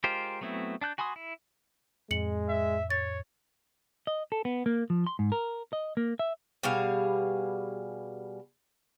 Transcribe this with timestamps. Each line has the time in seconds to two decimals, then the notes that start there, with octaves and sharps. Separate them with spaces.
0.04 G#3 F4 G4 A#4 C5
0.41 F#3 A3 B3 C4 E4
0.81 D4 A5 F#6 G6
0.98 F#4 G#5 B5 C6 D#6
1.16 E4
2.11 F2 A2 G#3 C#7 F#7
2.48 E5
2.90 C#5 A6
4.07 D#5
4.32 A4
4.45 B3
4.66 A#3
4.90 F3
5.07 C6
5.19 G#2
5.32 A#4
5.73 D#5
5.97 A#3
6.19 E5
6.63 B2 G3 G#4 F5